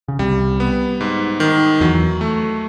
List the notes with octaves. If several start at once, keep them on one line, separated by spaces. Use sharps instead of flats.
C#3
C2 C3 G3
B3
G#2
D#3
E2 E3 F#3
A3